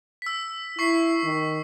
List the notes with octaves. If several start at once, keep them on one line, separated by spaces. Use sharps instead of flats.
E6 B6
E4 C#6 B6 C7
D#3